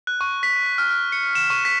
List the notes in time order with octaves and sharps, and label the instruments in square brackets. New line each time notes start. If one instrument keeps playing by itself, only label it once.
[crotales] F#6
C#6
B6
F6
F6
C#7
E7
C#6
B6